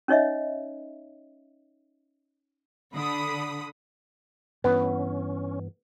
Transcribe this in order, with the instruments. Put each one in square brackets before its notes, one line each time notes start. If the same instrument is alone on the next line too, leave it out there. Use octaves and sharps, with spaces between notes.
[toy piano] C#4 D#4 C#5 D#5 E5
[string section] D3 B5 D#6
[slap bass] G2 E3 [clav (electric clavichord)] B3 [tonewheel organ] C#4 [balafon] B4